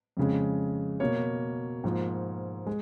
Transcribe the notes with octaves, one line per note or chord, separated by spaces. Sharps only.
F2 C#3 G#3
B2 A#3 C#5
G#2 F3 A#3
G#3